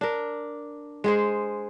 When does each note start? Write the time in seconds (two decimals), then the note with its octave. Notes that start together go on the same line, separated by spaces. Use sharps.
0.01 D4 A#4
1.04 G#3 G#4 C5